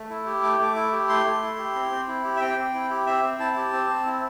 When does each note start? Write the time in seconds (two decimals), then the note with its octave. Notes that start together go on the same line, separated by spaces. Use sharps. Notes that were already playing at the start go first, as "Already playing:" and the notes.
Already playing: A3
0.10 E4
0.26 G4
0.43 A3 D6
0.59 A3 D6
0.76 E4
0.92 G4
1.09 A3 C6
1.25 A3
1.42 E4
1.58 G4
1.75 C4
1.91 C4
2.07 E4
2.24 G4
2.36 E5
2.41 C4 G5
2.57 C4
2.74 E4
2.90 G4
3.07 C4 E5
3.23 C4
3.39 E4 A5
3.56 G4
3.73 C4
3.89 C4
4.06 E4